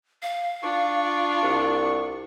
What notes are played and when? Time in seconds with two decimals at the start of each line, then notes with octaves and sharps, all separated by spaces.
0.23 F5
0.63 D4 F4 C#6
1.43 C2